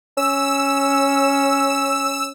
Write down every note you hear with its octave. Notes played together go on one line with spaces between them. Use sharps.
C#4 E6